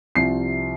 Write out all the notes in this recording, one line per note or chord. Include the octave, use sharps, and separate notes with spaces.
C2 C3 F3 C7